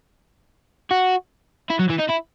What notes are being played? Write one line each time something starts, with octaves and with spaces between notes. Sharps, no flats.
F#4
E4
F#3
E3
D#4
E4